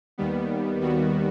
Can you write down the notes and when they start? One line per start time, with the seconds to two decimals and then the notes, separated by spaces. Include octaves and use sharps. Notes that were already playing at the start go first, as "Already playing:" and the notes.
0.18 D#2 D#3 G3 B3
0.81 D#2 D#3 G3 B3 F#4